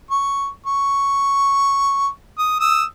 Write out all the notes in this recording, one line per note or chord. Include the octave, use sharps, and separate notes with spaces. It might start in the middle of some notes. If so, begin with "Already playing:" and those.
C#6
C#6
D#6
D#6 E6